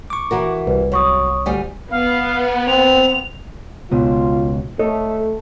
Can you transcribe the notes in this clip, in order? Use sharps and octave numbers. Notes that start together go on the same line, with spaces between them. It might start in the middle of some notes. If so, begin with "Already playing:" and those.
C#6 D6
E3 F#4 A#4
C2 B4
F#2 C#5 C#6 D#6
D2 G3 G#5
B3 F5
C4 F7
C#2 B2 F4
A3 A4 C#5 D#5